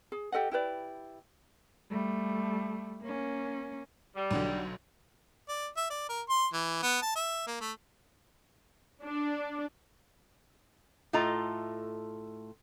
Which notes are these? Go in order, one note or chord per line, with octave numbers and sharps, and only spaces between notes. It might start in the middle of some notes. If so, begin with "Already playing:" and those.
G#4
G4 A4 D#5 F#5
E4 G4 B4 D5
G3 A3
A#3 C#4
G3
B1 D3 F#3
D5
E5
D5
A#4
C6
E3
B3
A5
E5
A#3
A3
D4
A2 A3 F4 D#5 A#5